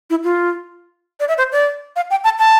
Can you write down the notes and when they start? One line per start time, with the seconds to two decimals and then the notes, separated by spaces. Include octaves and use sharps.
0.10 E4
0.24 F4
1.20 D5
1.28 E5
1.38 C5
1.52 D5
1.96 F5
2.11 G5
2.24 A5
2.39 A5